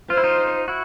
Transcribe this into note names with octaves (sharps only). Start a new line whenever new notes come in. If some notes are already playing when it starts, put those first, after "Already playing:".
F4 C5
E4
D#4 F4
E4 F#4